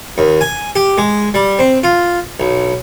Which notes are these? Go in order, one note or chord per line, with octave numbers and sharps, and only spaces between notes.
D#2
G#5
G4
G#3
G3
C4
F4
B1